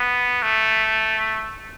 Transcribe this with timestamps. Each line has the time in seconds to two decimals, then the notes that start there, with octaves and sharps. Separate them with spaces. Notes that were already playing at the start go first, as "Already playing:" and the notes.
Already playing: B3
0.42 A3